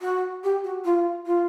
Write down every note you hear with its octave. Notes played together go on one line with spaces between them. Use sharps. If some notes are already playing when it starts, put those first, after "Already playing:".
F#4
G4
F#4
F4
F4